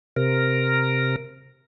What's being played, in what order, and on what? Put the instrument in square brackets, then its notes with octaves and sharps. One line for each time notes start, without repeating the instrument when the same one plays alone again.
[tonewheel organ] C3 A#4